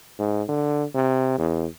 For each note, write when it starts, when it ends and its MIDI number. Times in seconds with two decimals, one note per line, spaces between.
0.19 0.43 44
0.49 0.84 50
0.94 1.35 48
1.38 1.66 40